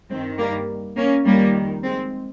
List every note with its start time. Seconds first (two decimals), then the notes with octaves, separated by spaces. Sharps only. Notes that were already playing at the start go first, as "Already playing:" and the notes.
0.10 G2 D#3 G#3 C4
0.38 G3 A#3
0.96 A#3 C#4
1.25 F2 D#3 G3 A#3
1.83 G#3 C4